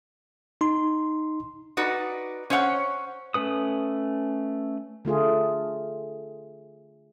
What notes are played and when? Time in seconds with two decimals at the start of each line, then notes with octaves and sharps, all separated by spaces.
0.61 D#4 C6
1.77 D#4 F#4 B4 D5
2.50 C#4 C5 C#5 F5 F#5
3.34 A3 C#4 B4 D#6
5.05 D3 A3 F4 G#4